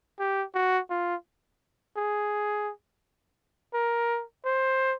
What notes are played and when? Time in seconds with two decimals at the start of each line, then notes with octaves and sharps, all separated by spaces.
0.19 G4
0.55 F#4
0.90 F4
1.96 G#4
3.73 A#4
4.45 C5